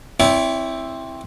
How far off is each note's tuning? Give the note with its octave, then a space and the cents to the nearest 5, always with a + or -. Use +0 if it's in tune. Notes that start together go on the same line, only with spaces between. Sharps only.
C4 +10 E4 +0 C#5 +45